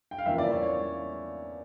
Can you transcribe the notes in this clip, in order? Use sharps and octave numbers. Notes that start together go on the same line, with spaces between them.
G5
F5
E2 C#3 F3 A#3 E5
D5
C#5
C#5